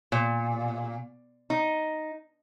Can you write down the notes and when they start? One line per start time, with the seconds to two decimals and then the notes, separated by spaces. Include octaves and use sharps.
0.12 A#2
1.50 D#4